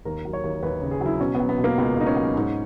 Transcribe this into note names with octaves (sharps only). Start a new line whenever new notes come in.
D#2 A#4
F#3
C#5
D#2
D#2 B4
C#3
G#4
F#3 E4
B2 C#4
B3
F#3
B3
B2
A#3
C#2 B3
C#2 D#4
C#4
F#3
G#2